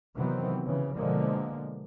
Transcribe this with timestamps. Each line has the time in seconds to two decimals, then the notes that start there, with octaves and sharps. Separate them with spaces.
0.16 C3 D#3 E3 F#3 B3 C4
0.65 C#3 E3
0.95 B2 D3 F3 G#3 A#3